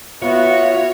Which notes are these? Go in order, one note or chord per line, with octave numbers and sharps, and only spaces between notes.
B3 F4 F#4 C#5 E5